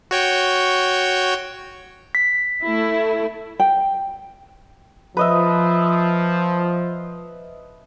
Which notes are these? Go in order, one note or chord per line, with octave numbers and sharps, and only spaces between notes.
F#4 C#5 G5
B6
A3 E4
G5
F3 B4 D#5 E5